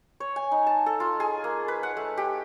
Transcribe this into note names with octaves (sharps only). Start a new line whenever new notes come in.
C#5
G#5
D#4
A5
A4
F4
G#4
A#3
B4
F#5
A3
G4